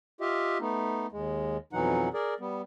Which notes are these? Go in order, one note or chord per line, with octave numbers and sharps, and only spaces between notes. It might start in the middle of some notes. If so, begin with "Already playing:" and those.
F4 G4 D#5 E5
A3 B3 D#4
D#2 G#3
F2 B2 E3 F#3 D#4 F#5
G#4 A#4 D5
G3 B3